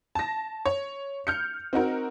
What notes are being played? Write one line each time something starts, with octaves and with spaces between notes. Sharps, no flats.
A5 A#6
C#5
F6 G6 C#7
C4 D#4 F#4 A#4